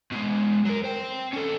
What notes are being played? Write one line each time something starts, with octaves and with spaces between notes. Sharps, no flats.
B2 G#3
F#3 A#4
C5 G5
C#4 A4